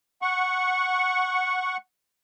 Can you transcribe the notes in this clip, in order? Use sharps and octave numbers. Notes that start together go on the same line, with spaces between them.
F#5 C#6